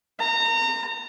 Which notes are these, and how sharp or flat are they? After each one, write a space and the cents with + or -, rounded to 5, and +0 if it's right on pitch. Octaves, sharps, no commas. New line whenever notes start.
A#5 -30